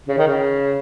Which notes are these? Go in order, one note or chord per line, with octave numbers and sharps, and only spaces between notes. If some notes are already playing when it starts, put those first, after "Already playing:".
C#3
D#3
C#3